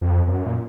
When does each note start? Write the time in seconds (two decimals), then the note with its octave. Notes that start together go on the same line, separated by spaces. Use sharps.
0.01 F2
0.27 F#2
0.46 A#2